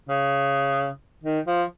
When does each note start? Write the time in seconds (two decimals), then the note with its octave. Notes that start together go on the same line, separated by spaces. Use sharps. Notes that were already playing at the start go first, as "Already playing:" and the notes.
0.09 C#3
1.23 D#3
1.47 F3